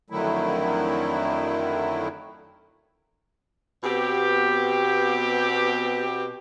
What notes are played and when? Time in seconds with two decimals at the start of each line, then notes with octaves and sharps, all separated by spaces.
0.10 F2 D3 D#3 F#3 A3 E4
3.83 B2 B3 C4 G4